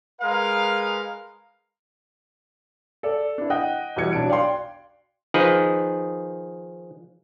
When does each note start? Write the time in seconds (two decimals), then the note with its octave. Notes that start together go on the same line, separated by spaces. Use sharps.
0.22 G#3 A#4 B4 F5
3.03 A4 D5
3.38 D4 E4
3.50 D#5 F#5 G5 D#6 F#6
3.96 E2 B2 G3 E4 G#6 C#7
4.13 B1 D4 A5 D7
4.30 D5 F5 G5 C6
5.34 D#3 F3 D#4 G#4 B4